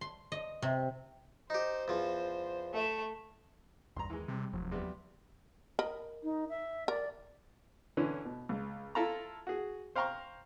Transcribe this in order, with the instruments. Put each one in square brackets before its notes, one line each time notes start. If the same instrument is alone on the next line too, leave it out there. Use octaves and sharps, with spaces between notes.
[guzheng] C6
D#5
C3
[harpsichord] D#4 G4 [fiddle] C5
[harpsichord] E2 F3
[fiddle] A3 E5
[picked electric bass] A#1 E2 G2 [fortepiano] A#5 C6
[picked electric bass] D#2 [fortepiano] E3 G#3
[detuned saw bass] C3 [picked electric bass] G3
[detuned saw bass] F1 [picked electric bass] D#2 F3 F#3
[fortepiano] C3 G3 B3
[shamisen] A#4 D#5 B5
[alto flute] D#4
E5
[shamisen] A#4 [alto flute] D5
[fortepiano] D3 E3 C#4
B2
C#2
E4 F4 A4 F5 A5 A#5
F#4 G#4
C5 F5 G5 A#5 C6 C#6